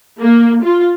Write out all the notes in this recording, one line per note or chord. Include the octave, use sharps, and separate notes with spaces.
A#3
F4